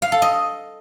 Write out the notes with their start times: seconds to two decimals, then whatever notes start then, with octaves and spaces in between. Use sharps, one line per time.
0.02 F5
0.12 A4
0.22 D#5